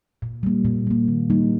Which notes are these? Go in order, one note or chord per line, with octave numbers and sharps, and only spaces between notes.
A#2
G3 A#3
A#2
G3 A#3
D#3
G3 A#3 D#4